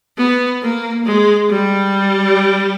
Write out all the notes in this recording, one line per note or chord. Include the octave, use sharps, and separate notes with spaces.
B3
A#3
G#3
G3